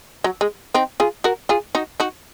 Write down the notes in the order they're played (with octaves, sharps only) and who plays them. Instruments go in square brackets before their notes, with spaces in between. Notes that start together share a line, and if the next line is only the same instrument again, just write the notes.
[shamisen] F#3
G#3
C4 D#4
F4 G#4
F#4 A#4
F4 G#4
D#4 F#4
D#4 F#4